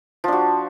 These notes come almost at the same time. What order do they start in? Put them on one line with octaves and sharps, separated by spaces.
F3 D4 F#4